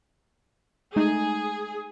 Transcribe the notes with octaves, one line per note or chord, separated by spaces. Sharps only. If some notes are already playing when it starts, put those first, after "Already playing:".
G#3 A3 D#4 G#4